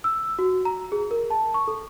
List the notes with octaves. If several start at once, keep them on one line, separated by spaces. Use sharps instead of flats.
E6
F#4
A#5
G#4
A#4
A5
C#6
A4